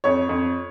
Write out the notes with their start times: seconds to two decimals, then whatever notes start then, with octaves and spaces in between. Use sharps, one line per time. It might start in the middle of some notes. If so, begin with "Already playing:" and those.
0.04 F2 C#5
0.29 F2